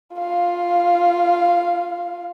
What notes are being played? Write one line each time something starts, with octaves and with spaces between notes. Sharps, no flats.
F4 F5